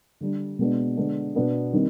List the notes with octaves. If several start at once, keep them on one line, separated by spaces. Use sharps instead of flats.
D3 G3 D4
B2 G#3 B3 D4
D3 G#3 B3 D4
B2 B3 D4
D#3 G3 C4 D#4